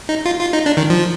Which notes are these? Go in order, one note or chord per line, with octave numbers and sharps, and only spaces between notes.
D#4
F4
F4
D#4
D4
D#3
F3